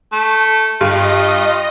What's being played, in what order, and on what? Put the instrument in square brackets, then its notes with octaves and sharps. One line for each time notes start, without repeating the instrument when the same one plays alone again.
[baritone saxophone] A3
[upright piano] G2 [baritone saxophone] F4 [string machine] D#5